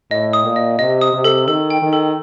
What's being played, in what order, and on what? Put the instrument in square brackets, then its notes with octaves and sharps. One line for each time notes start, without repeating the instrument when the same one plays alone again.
[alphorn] A2 [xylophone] D#5
[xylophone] D#6
[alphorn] A#2
[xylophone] D#5
[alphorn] C3 [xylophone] D#5
[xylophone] D#6
[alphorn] C3
[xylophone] A4
[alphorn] D#3 [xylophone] A4
[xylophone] G5
[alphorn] D#3
[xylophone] A4